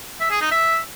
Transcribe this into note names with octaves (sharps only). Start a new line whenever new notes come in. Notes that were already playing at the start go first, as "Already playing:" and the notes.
E5
G#4
D#4
E5